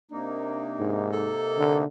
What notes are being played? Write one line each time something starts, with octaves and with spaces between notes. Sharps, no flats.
C3 A#3 D4 D#4
G#2
A4
D3